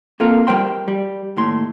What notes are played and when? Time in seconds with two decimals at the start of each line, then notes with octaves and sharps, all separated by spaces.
0.20 A#3 C4 F4 A4 A#4
0.47 G3 A#4 C5 G5 C6
0.88 G3
1.37 D#2 A2 C6